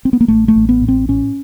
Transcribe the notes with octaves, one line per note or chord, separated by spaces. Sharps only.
C4
B3
A#3
A1 A3
A3
A1
B3
A2
C4
A2 C#4